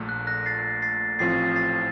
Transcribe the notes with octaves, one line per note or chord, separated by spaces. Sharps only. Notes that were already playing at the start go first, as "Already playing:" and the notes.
Already playing: A#1 A#2 A3
F#6
F#6 A#6
A6 C7
A6 C7
A1 A2 F3 C4 F4 A6 C7
A6 C7